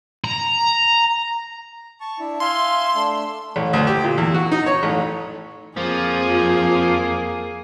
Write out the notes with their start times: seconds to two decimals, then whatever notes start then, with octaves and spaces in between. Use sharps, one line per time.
0.24 A#5
2.00 A5 C#6
2.19 D4 E4
2.40 E5 F5 G#5 C6
2.95 A3 D4 E6
3.56 A1
3.73 D2
3.87 G4
4.04 A#2
4.18 E2
4.34 F#4
4.52 D#4
4.66 C#5
4.83 A1
5.77 F2 F3 A#3 G#4